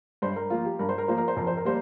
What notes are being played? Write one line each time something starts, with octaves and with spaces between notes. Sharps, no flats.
G2 C5
A#4
F3 A#3 F4
G4
G2 A#4
C5
A#4
F3 A#3 C5
A#4
C5
F2 A#4
C5
A#4
G3 A#3 C5